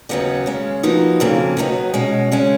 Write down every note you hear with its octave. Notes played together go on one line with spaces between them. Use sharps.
D#2 C#3 F#3 B3 D#4
C#3 G#3 C#4
F3 A#3 D#4 F#4 B4
F2 C#3 F#3 A#3
D#2 D#3 F#3 B3 D#4
B2 G#3 C#4
C#3 G#3 C#4